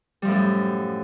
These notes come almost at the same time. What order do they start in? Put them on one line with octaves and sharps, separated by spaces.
G3 F3 A2 F#2